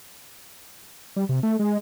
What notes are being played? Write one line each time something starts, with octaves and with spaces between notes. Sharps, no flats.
G3
C3
A3
G#3